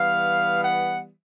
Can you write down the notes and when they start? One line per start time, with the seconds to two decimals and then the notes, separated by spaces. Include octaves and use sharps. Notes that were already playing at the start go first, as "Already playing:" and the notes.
Already playing: E3 G3 B3 F5
0.64 F#5